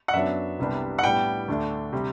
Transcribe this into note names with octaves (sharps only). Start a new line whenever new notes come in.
F#5
F#2 F#3 B3 D4 E5
C2 C3 G3 B3 D4
F#5
A2 G3 B3 D4 G5
D2 D3 A3 D4
C3 G3